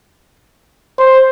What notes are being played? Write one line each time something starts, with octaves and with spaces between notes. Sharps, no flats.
C5